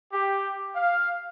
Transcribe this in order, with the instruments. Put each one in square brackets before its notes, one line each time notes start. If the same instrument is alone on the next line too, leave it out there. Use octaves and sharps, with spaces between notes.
[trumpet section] G4
F5